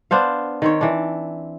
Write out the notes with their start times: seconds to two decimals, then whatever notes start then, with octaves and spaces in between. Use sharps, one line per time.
0.11 B3 D4 C5 F5
0.62 D#3 C4 C#5
0.81 E3 D4